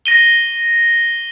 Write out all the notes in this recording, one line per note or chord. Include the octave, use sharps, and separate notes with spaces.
A#6 D#7 G7